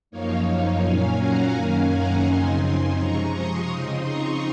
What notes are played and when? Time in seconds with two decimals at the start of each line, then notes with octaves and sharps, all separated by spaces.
0.11 F#2 F3 A#3 D#4 C#5 F5
0.82 A#2 F#3 A#3 C#4 F5 G#5
1.18 F#5 A#5
1.54 F#2 D#3 A#3 C#4 F5 G#5
1.89 F#5 A#5
2.25 F#2 C#3 F3 C4 D#4 G#5 C6
2.61 G#5 C6
2.96 C3 F3 G#3 A#5 C#6
3.32 C6 D#6
3.68 C#3 F3 C4 D#4
4.03 A#5 C#6